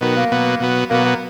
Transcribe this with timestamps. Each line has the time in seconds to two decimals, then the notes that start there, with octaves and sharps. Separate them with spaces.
0.01 B2 D#3 F#3 B3
0.16 A#3
0.32 B2 F#3 B3
0.60 B2 F#3 B3
0.90 B2 F#3 A#3 B3
1.05 A#3